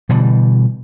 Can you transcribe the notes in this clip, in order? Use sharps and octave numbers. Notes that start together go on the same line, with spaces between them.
B2 D3 E3 G3